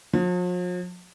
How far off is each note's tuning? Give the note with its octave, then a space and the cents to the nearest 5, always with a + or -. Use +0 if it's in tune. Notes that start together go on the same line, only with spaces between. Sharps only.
F3 +45